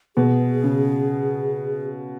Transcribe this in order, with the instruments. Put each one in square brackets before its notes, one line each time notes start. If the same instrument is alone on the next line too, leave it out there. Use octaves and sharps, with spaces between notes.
[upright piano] B2 [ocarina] G#4
[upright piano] C#3